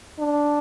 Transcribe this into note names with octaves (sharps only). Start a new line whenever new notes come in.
D4